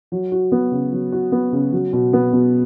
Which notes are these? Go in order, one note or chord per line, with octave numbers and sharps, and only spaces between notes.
F#3
F#4
B3
C#3
F#3
F#4
B3
C#3
F#3
B2
B3
B2